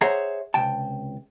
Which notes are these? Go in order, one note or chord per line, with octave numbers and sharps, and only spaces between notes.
G#4 C5 C#5 E5 F#5 A#5
C#2 C3 G5 A5